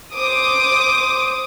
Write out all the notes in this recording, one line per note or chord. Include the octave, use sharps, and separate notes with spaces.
C5 D6 D#6